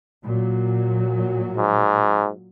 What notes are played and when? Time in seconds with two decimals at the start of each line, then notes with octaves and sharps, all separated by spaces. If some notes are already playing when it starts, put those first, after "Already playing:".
0.23 A#2 F#3
1.57 G#2